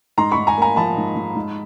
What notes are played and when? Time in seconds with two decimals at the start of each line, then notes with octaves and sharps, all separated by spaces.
0.18 G#2 A#5 C6
0.32 B5 C#6
0.37 G#2
0.47 G#5 A#5
0.58 A#3 G#5 A#5
0.76 F3 A5 B5
0.97 G#2
1.15 G#2
1.35 G#2